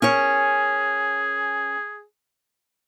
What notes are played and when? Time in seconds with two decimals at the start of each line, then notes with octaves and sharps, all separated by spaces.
0.02 C#4 G#4 A#4 C#5